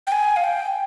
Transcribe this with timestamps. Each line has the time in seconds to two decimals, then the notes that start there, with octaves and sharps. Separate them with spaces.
0.07 G5
0.12 G#5
0.36 F5
0.44 G5